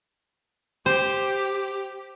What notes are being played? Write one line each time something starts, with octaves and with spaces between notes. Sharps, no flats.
G4 C5